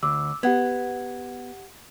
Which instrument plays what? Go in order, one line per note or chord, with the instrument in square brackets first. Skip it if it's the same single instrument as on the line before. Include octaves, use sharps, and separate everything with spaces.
[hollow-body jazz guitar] D2 [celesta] D6 E6
[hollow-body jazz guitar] B3 [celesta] G4 F#5 G#6